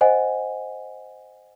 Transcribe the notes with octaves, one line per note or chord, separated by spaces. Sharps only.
C5 D#5 F#5 G#5